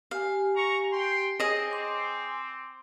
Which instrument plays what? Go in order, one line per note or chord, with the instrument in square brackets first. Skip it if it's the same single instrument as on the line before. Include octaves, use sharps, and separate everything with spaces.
[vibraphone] G4 G#5 [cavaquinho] F5
[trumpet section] A#5 C#6
G5 C6
[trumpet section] C4 [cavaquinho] G#4 D#5 [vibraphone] C#5
[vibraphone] C6 D6